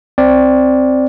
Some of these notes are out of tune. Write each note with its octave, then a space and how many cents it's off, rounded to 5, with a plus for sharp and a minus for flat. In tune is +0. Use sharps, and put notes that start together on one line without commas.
C4 +0 D5 +0